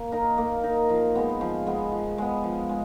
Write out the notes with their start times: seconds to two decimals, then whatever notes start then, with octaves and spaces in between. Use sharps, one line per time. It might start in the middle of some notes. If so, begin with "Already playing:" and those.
Already playing: A#3
0.12 D#4 A#4
0.38 A#3
0.64 D#4 A#4
0.89 F3
1.15 G#3 B3
1.41 F3
1.67 G#3 B3
1.92 F3
2.18 G#3 B3
2.44 F3
2.69 G#3